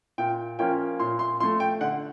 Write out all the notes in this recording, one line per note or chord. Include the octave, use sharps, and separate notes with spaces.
A#2 G5
F3 A#3 C#4 F4 G5
A#2 C6
C6
F3 A3 C6
G5
D3 F#5